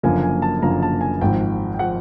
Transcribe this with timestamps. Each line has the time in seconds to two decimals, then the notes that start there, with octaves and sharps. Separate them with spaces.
0.03 F#1 F#2 D3 F3 A#3 G#5
0.23 G#5
0.42 A5
0.62 F#1 F#2 D3 F3 A#3 A#5
0.82 A5
1.01 G#5
1.21 G#1 G#2 F3 G5
1.74 G5
1.79 F3 F#5